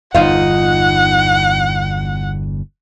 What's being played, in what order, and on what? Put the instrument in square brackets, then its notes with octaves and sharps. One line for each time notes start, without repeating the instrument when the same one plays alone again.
[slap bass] G1 E2 [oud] D#4 F4 F5 [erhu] F#5